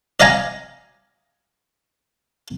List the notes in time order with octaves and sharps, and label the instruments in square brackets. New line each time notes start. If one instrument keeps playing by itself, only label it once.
[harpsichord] D5 D#5 F5 G5 G#5 A#5